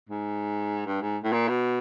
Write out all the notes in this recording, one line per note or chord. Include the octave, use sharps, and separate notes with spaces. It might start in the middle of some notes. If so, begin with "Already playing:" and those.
G#2
G2
G#2
A2
A#2
B2